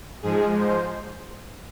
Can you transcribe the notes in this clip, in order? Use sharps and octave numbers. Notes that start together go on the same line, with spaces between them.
G#2 F3 G#3 G#4
C5